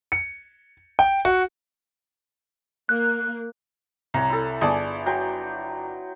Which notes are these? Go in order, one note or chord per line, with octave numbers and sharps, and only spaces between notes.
C#7
G5
F#4
A#3 F#6
C2 C#5 A#5
E4 A4
G1 G#4 D5 A5
F#3 G5 C6